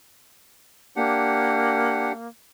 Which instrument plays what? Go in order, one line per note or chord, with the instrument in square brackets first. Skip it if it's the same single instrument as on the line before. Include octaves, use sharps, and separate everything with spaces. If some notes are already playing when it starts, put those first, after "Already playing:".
[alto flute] A#3 [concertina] D4 G4 F#5